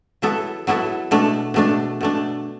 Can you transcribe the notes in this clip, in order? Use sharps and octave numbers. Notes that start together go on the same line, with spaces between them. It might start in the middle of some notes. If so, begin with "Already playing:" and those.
F#3 B3 E4 A4
F#3 B3 E4 A4
B2 A3 D4
B2 A3 D4
B2 A3 D4